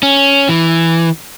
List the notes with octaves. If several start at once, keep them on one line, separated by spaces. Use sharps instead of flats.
C#4
E3